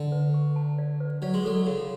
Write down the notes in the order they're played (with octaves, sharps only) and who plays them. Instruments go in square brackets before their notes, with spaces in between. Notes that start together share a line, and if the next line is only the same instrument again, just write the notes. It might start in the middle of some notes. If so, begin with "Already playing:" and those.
Already playing: [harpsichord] D3
[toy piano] B4
C#6
A5
D5
B4
[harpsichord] F#3 [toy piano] D5
[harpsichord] G#3
[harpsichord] F#3 [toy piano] A4
[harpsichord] C#3 [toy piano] F#4